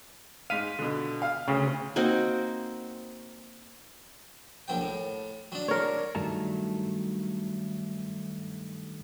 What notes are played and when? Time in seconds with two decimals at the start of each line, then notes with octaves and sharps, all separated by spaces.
0.50 G#2 F5 B6 D#7
0.79 B2 D3
1.22 F5 F6
1.48 D2 C#3
1.96 A#3 C4 D#4 F#4
4.68 A#1 F#3 G5
4.81 A2
5.52 F#3 D4
5.68 A#4 C#5
6.15 G2 D#3 F#3 A3 A5 A#5